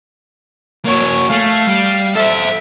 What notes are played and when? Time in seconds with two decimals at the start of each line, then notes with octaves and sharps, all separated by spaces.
0.85 A#3 F#4 C#5
1.30 A3 F5
1.68 G3
2.15 A4 C5 E5